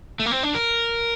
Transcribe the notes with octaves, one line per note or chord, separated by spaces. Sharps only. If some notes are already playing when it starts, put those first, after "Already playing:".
A3
A#3
C4
D4
A#4